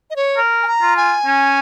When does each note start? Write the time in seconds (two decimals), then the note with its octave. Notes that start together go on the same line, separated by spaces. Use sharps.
0.10 D#5
0.16 C#5
0.37 A#4
0.63 G#5
0.67 A#5
0.81 F4
0.97 G#5
1.26 C#4